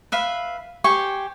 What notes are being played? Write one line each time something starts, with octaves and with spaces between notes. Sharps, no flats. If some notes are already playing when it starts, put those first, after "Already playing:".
B4 E5 F5
G4 C5 G#5 C#6